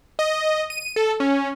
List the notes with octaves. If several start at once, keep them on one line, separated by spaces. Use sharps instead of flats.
D#5
D#7
A4
C#4